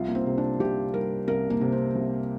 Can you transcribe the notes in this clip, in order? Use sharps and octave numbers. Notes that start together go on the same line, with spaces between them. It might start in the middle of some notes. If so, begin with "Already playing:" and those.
Already playing: C2 F4
A#3
C4
C3
D4
C2 G4
G3 A#4
C2 A#4
A#3
C3
C4
C2